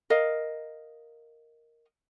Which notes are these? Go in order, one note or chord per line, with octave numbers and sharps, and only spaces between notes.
A#4 D#5 F5